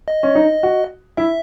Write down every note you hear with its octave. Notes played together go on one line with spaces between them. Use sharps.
D#5
C#4
D#4
F#4
E4 E5